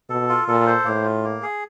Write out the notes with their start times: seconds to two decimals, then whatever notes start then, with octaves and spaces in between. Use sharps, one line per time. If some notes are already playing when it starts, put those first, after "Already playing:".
0.10 B2 A4
0.29 F4
0.48 A#2 A4
0.67 C5
0.85 A2 A#3
1.04 F4
1.24 A#3
1.42 G#4